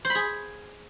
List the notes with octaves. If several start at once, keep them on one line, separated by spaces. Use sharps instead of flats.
C5
B5
G#4